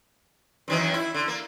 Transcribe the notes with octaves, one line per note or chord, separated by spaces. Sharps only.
F#2 D#3 E3
E4
D3
A#3